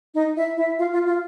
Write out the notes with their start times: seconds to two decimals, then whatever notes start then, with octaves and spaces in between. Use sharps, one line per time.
0.15 D#4 D#5
0.36 E4 E5
0.57 E4 E5
0.78 F4 F5
0.92 F4 F5
1.07 F4 F5